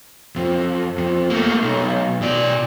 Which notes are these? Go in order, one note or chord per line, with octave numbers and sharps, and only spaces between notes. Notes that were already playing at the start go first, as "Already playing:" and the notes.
F2
F2
A3 A#3
B1
B2 D5